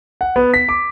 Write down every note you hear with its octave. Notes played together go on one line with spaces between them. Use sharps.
F#5
B3
B6
D6